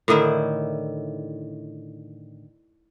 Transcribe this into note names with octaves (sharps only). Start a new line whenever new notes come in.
A2 D3 D#3 E4